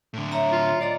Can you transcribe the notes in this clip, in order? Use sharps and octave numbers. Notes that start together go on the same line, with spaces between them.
A2 D3
C#5 E5 A#5
F4
D5 D#5 A#5 D6